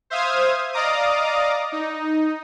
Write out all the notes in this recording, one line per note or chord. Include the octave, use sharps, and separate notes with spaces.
C5 E5 F5 D#6 F6 G#6
D5 D#5 F5 A#5 D6 D#6
D#4